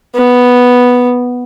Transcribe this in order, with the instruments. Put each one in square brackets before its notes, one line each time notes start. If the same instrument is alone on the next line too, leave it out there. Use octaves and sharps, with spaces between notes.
[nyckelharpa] B3